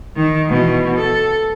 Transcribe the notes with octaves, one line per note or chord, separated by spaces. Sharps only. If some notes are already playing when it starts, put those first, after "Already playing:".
D#3
B2 E3
A4